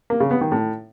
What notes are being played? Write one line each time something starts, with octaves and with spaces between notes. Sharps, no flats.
A#3
C#3
B3
D#3
A2